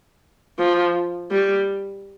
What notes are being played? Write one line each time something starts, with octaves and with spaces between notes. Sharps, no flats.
F3
G3